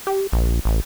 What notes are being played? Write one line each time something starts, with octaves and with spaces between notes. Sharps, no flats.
G4
A#1
A1